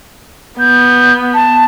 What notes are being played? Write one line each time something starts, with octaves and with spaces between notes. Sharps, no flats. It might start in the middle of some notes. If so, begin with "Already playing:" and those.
B3 G6
A5